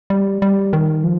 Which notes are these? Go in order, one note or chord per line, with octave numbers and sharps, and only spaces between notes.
G3
G3
D#3
F3